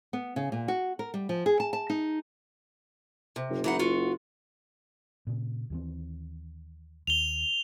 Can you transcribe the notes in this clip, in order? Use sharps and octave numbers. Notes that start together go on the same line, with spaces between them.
B3
C#3
A#2
F#4
A#4
G3
F3
G#4
A5
A5
D#4
C3
F#1
E3 D#4 F#5
F4 F#4
A#2 C#3
D#2 E3 C4
D#2 F7 G7